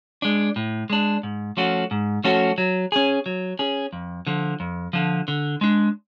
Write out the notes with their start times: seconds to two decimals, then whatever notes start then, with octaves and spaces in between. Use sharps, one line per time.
0.22 G#3 D4
0.56 A2
0.90 G#3 D4
1.23 G#2
1.57 F3 A3 C#4 F#4
1.91 G#2
2.24 F3 A3 C#4 F#4
2.58 F#3
2.92 C#4 G#4
3.26 F#3
3.59 C#4 G#4
3.93 F2
4.27 D3 F3
4.60 F2
4.93 D3 F3
5.28 D3
5.61 G#3 D4